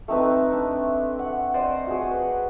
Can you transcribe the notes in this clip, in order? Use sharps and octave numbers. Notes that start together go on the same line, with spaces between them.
A3 C4 D#4 B4
D4
F#5
C5 D5 D#5
F#4 G#4
B4